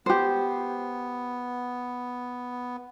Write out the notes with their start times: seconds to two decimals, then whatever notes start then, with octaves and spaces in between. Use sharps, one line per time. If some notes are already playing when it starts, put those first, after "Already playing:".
0.06 B3 G4 C5